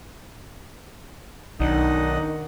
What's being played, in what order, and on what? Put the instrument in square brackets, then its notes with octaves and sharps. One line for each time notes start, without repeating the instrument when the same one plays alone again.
[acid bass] B1 [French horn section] D#3 [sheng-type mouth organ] D4 D#5 F#5 [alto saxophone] D#4